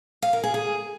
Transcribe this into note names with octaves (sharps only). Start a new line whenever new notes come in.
F5
A#4
G#4
G#4